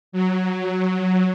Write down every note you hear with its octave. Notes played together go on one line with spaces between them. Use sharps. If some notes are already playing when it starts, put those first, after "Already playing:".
F#3